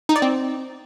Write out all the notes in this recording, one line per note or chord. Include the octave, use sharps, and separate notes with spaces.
D#4
D5
C4